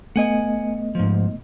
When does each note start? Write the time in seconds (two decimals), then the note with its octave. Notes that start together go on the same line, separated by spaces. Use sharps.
0.16 A3 B3 D#5 F#5 G#5
0.95 G#2 F3